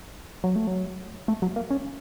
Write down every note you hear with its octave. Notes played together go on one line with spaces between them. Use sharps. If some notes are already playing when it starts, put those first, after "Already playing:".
F#3
A3
F#3
A3
F#3
A#3
C#4